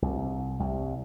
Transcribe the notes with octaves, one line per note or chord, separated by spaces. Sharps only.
C2
C2